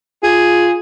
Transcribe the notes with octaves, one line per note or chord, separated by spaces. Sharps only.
F4 G#4